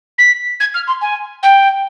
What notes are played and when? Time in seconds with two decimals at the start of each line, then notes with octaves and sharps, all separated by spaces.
0.18 B6
0.60 G#6
0.74 F6
0.87 C6
1.01 G#5
1.43 G5